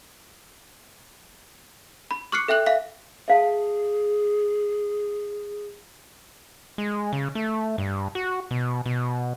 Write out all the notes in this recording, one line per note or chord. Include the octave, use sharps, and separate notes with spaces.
B5
C#6 D6 F6 F#6 C7 C#7
A4 E5 G5 F#6 F#7
E5 F5 B6
G#4 E5 F5 A5
G#3
C#3
A3
G2
F#4
B2
B2